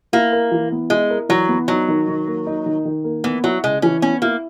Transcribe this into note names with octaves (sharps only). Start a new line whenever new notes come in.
A#3 E4
A#4
E3
B3
G#3 E4
A#4
E3 F#3
B3
F#3 D#4
D#3
D#3
A#3
D#4
D#3
D#3
A#3
E3 B3
F#3 E4
C#3 G#3
E3 C#4
B3 C#4
A#3 E4